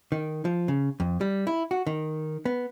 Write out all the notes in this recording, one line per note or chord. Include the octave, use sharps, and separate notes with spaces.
D#3
F3
C#3
F2
G3
E4
F#4
D#3
B3